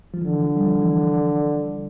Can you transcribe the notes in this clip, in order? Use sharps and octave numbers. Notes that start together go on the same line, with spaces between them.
F3
D3 E3
F3
G3
F3
E3